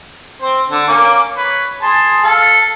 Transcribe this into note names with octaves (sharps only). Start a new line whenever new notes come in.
C4 C5
D3
A#3 C#4 D6
B4 C#5
G#4 A5 C6
A4 F5